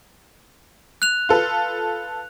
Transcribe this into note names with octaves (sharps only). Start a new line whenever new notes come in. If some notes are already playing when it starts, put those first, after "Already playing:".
F#6 F7
F4 A4 B4